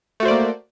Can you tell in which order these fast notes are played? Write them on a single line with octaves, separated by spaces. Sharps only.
A3 F#4 C5 D5 A#3